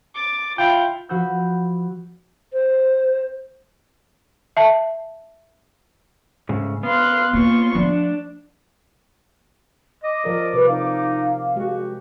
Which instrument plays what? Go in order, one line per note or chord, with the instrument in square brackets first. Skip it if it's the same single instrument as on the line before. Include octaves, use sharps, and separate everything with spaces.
[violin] D6 A6
[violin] E4 [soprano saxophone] F4 [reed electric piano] G5
[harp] F3 F#4 B5 E6 G6
[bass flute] C5
[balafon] E5 A5
[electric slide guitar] G#2 C#3 A3
[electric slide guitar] B3 [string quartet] F5 C6 F#6
[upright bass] A#3 [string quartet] F4 C6 C#6
[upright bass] F3 A3 [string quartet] D4
[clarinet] D#5 [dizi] D6
[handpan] F3 A#4 D5
[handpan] C3 [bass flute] B4
[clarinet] D#4 [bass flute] F5
[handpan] G#3 G4 [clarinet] F#4